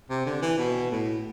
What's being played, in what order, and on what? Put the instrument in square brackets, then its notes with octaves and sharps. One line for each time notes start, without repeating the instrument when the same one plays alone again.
[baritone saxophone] C3
D3
E3
B2
A2